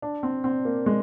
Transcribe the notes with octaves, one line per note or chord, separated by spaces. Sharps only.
D4
C4
C4
A#3
G#3